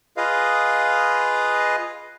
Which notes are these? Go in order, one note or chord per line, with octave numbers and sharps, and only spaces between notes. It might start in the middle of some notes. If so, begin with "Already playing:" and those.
F4 G#4 B4 D#5 F5